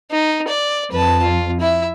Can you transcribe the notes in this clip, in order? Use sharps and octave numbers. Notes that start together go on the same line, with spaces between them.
D#4
D5
F2 B4 A5
F4
E4 E5